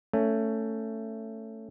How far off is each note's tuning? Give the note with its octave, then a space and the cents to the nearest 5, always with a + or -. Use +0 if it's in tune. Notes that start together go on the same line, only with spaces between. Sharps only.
A3 +15 C#4 +10